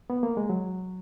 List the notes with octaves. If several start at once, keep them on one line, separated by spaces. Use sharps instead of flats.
B3
A#3
G#3
F#3